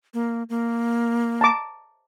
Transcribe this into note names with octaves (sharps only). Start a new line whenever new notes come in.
A#3
A#3
A5 A#5 D6